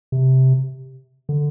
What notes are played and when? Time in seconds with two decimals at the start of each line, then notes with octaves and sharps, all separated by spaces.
0.12 C3
1.29 D3